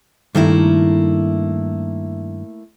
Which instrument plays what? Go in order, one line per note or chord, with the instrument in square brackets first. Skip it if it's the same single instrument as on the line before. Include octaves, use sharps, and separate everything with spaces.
[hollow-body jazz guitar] G2 D#3 [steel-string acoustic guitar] A3 A#3 E4